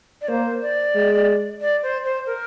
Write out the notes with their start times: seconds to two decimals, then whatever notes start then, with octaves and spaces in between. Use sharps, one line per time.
0.21 D5
0.28 A#3 C5
0.62 D5
0.95 G#3
1.61 D5
1.83 C5
2.04 C5
2.26 A#4